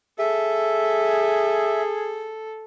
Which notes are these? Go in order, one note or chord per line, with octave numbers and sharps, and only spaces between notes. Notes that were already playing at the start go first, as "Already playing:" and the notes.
G#4 A4 E5